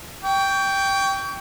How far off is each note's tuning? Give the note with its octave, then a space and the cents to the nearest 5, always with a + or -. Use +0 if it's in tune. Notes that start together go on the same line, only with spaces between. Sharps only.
G5 +0 C#6 +35